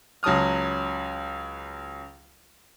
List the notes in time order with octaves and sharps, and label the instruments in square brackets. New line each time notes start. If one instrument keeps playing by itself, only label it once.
[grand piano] C#2 F#3 A5 D#6 F6